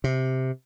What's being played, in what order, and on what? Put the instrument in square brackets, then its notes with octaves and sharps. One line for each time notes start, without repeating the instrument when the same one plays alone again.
[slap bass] C3